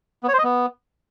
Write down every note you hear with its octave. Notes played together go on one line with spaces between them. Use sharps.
B3
C#5
C5
D#5
B3